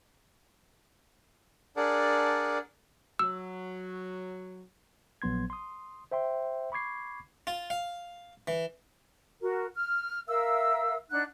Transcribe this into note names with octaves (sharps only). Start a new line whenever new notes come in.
D4 G#4 A#4 D5 F#5 A5
F#3 E6
A#1 F#3 B3 C6 G#6
C6 D#6
C5 E5 G5 C6
B5 C#6 D6 G#6 C7
F4
F5
E3
F#4 A#4
F6
A#4 E5 F5 E6
D4 D#4 F#5 F#6